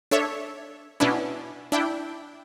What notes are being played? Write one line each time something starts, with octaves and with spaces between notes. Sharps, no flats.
D4 A4 C#5 E5
B2 B3 C#4 D4 E4
D4 E4 G5